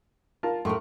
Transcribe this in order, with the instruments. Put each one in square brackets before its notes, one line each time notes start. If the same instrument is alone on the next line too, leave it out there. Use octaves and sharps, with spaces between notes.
[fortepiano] F4 A#4 A5
[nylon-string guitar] A2 A#4 [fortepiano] C6 C#6